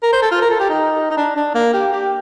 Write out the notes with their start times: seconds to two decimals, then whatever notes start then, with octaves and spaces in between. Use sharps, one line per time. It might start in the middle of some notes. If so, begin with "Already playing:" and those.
0.03 A#4
0.13 C5
0.22 A4
0.31 F4
0.41 A#4
0.50 A4
0.60 G4
0.70 D#4
1.11 D#4
1.17 D4
1.37 D4
1.55 A#3
1.74 G4
1.93 G4